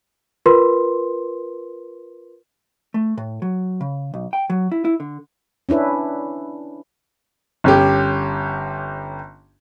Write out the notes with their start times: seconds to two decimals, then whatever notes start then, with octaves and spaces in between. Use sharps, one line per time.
0.46 F4 A#4 B4 C6
2.94 A3
3.18 A2
3.42 F#3
3.81 C#3
4.14 B1
4.33 G5
4.50 F#3
4.72 E4
4.85 E4
5.00 D3
5.69 C#4 D4 E4 B4
7.64 G1 C#4 G4